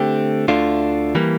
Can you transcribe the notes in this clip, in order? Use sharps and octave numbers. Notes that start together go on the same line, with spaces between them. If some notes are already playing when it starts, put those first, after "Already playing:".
Already playing: D3 A3 C4 G4
D2 D3 A3 D4 F4
E3 G3 A#3